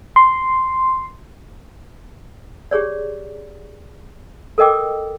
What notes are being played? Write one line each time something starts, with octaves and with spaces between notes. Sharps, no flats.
C6
G4 G#4 C#5 D5
A4 A#4 D#5 G5 D6